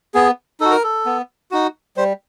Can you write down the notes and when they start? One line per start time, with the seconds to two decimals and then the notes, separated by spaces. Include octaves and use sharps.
0.14 B3 G#4
0.60 D#4 F#4 A4
0.71 A#4
0.83 A4
1.06 B3
1.51 D#4 F#4
1.97 G3 C5